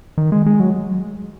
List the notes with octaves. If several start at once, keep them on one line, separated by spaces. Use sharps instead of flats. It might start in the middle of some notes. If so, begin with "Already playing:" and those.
D#3
G#3
G#3
F#3